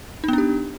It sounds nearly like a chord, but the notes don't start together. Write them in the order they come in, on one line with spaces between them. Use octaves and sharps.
D#4 B3 D4 G4